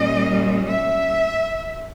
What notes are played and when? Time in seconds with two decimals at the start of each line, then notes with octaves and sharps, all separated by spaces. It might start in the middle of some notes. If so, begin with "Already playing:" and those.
Already playing: A#2 G3 C#4 D#5
0.69 E5